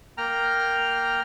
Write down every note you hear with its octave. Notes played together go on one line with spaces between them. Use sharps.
A#3 G5 A#5 F6